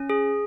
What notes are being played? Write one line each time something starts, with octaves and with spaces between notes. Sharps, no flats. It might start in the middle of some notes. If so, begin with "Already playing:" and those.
Already playing: C#4
G#4